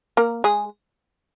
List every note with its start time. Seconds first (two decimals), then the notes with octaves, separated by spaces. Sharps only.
0.17 A#3 A#4
0.44 G#3 G#4